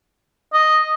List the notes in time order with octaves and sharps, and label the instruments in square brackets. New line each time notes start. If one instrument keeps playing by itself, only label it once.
[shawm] D#5